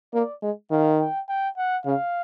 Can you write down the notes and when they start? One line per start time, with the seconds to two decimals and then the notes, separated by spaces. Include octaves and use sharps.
0.14 A#3 D5
0.42 G#3
0.71 D#3 F5
1.01 G5
1.29 G5
1.58 F#5
1.86 C#3 F5